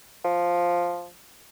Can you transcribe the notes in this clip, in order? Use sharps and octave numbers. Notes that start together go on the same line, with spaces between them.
F3